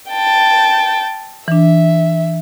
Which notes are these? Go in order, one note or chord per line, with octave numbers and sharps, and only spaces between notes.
G5 A5
E3 D4 E5